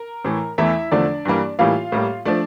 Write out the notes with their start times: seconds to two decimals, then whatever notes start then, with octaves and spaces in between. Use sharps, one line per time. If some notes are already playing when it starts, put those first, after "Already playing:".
Already playing: A#4 A#5
0.25 A2 E3 A3
0.58 E2 E3 A3 E4 E5
0.91 E2 D3 F3 A3 D4 D5
1.25 G2 E3 G3 A#3
1.59 A2 E3 G3 A#3 F4 F5
1.92 A2 G3 A#3
2.25 F3 A3 D4 D5